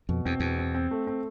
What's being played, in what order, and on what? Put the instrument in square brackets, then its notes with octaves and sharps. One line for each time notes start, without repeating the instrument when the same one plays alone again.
[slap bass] F2 [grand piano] B2
[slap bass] E2 [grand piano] C4
[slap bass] E2 [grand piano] B2
[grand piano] C4
C4
A3
C4